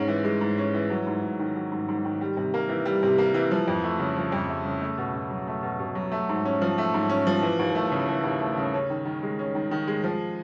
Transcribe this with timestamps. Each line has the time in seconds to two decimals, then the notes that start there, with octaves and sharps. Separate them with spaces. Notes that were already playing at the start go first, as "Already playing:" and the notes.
Already playing: G#2 G#3 C#4
0.08 E3
0.24 G#3
0.41 G#2
0.58 C#4
0.74 E3
0.90 F#3
1.07 G#2
1.23 G#2
1.39 D#3
1.56 F#3
1.72 G#2
1.89 G#2
2.05 D#3
2.21 G3
2.37 C3
2.54 A#3
2.69 E3
2.85 G3
3.03 C3
3.18 A#3
3.34 E3
3.51 F3
3.68 F2
3.84 A3
4.00 C#3
4.17 F3
4.32 F2
4.48 A3
4.65 C#3
4.81 A3
4.98 B2
5.15 B2
5.30 F#3
5.47 A3
5.63 B2
5.79 B2
5.95 F#3
6.12 A3
6.29 G#2
6.45 C#4
6.62 F3
6.78 A3
6.94 G#2
7.09 C#4
7.27 F3
7.42 E3
7.59 D#2
7.75 A3
7.92 C#3
8.09 E3
8.24 D#2
8.40 A3
8.57 C#3
8.74 C#4
8.90 D#3
9.05 D#3
9.23 G#3
9.39 C#4
9.55 D#3
9.71 D#3
9.87 G#3
10.04 F3